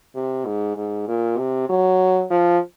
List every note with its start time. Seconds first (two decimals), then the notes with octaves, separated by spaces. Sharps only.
0.16 C3
0.46 G#2
0.77 G#2
1.08 A#2
1.38 C3
1.69 F#3
2.31 F3